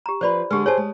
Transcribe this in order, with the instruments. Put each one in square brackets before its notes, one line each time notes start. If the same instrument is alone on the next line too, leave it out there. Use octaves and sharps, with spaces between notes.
[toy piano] G4 A#5
[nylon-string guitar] F3 B4 [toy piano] C5 D5 B5
[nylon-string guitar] D3 G#3 [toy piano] G4 B4
[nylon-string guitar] G#4 C5 [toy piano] C#5 G#5 A5
[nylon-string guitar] G#3